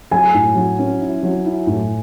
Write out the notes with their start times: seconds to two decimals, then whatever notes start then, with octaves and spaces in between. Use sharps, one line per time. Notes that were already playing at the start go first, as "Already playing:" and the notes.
0.11 F#3 G#5
0.34 A2
0.55 F#3
0.79 C#4
1.01 E4
1.23 F#3
1.46 E4
1.67 A2